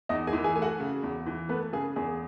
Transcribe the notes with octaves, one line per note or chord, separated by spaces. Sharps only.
E2 D#4 D#5
G#4 G#5
E3
G#4 G#5
A3 G#5
F#4 F#5
C#3
E2
E3
A3 B3 B4
C#3 G#4
E2 G#4